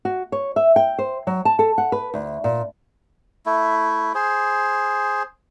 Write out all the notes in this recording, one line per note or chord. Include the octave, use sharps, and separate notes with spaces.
F#4
C#5
E5
G5
C5
F#3
A5
A4
F#5
B4
D2
A#2
A3 E4
G#4 C5